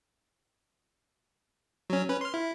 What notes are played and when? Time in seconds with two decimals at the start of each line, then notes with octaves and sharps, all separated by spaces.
1.90 F#3 C#4
2.09 C#4 B4
2.21 C6 F6
2.34 E4